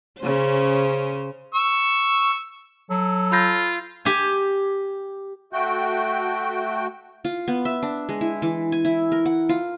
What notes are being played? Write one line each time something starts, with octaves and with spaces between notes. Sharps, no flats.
C#3 C#4 C5
C#6 E6
F#3 A4
F4 B5 G6 A#6
G4 G#5
A3 F#4 G5
F4
B3
E5
D4
G#3
E4
E3
G#5
E4
A#4
F#5
F4